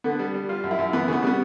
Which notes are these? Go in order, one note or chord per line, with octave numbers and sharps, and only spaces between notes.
D3 B3
G3
G3
G3 F4
F#2
E4
F#2
E3 B3
C#3 B3
G3 B3